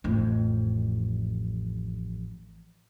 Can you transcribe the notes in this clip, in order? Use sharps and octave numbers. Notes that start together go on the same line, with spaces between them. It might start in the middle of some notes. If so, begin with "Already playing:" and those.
A1 F2